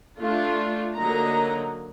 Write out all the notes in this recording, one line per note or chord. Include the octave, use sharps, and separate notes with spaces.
A3 D4 F4
D3 F#3 A#3 D#4 A#5